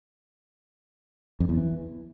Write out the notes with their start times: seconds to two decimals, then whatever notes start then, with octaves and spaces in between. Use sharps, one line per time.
1.40 F2
1.49 E2
1.58 E3